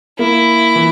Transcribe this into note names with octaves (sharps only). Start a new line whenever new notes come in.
A#3 E4
E3